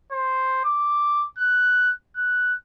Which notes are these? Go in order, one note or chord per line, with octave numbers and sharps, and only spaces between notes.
C5
D6
F#6
F#6